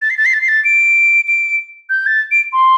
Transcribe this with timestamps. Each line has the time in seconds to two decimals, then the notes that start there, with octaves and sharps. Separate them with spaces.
0.02 A6
0.10 C7
0.17 A6
0.26 C7
0.34 A6
0.41 C7
0.48 A6
0.65 D7
1.28 D7
1.90 G6
2.07 A6
2.31 D7
2.53 C6